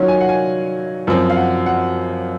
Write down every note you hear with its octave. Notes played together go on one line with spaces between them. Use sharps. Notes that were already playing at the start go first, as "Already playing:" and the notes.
Already playing: D#3 F#3 C#4 F4 F5
G#5
F#5
G#5
F#2 F3 C4
F5
F#5
F#5